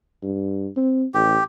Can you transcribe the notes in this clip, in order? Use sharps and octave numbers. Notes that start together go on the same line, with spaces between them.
G2
C4
A1 G4